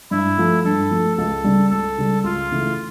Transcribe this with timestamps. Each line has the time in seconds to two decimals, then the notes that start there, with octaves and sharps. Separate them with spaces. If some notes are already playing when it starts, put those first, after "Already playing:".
0.11 G2 E4
0.38 F3 A3
0.65 G2 A4
0.91 F3 A3
1.18 C#2 A4
1.44 C#3 G3
1.70 C#2 A4
1.98 C#3 G3
2.24 C#2 F4
2.51 C#3 E3 A3 E4